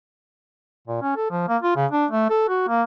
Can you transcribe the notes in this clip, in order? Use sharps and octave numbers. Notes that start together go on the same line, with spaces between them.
A#2
C#4
A4
F3
A#3
F4
C#3
D4
A3
A4
F#4
A#3